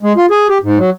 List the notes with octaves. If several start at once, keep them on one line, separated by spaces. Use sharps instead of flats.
G#3
F4
G#4
G4
G#2
F#3